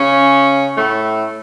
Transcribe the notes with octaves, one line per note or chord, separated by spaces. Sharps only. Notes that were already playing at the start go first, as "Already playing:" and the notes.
Already playing: C#3 C#4
A2 A3